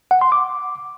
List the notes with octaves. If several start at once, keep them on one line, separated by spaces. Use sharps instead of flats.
F#5
C6
D6